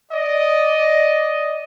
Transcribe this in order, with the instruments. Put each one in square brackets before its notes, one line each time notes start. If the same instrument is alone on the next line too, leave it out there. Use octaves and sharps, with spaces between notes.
[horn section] D5 D#5